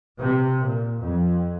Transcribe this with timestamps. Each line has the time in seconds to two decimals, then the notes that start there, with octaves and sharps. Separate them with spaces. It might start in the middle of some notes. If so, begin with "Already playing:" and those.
0.19 C3
0.63 A#2
1.00 F2